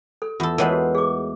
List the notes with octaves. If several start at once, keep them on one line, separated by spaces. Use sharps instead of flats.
A4
E2 F4 A4
E3 G#3 A3 A#4 C#5 F#5
F#4
G#4 D6